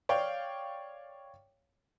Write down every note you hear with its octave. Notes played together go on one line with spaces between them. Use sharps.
C#5 D5 F5 G5